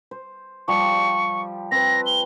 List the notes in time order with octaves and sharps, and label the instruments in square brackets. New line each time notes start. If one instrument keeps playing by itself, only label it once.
[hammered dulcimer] C5
[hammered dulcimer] F3 G3 G4 [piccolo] C#6
[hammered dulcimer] C4 B4 [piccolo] A#6
[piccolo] G7